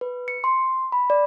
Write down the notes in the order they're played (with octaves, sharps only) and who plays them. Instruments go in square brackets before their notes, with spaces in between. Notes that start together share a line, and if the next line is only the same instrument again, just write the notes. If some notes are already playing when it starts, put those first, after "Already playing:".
[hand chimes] B4
C#7
C6
B5
D5